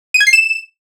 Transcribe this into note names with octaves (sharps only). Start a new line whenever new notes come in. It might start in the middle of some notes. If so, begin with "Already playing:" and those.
D#7
G#6
C7
E7